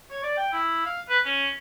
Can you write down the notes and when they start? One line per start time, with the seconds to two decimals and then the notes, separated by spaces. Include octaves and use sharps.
0.11 C#5
0.23 D5
0.37 G5
0.53 E4
0.86 F5
1.09 B4
1.25 C#4